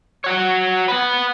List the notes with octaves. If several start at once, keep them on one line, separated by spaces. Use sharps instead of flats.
F#4 C#5
B4 F#5